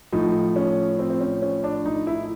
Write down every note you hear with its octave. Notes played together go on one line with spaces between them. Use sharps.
A2 F3 D#4
C#4
C4
C4
C#4
C#4
D4
D#4
E4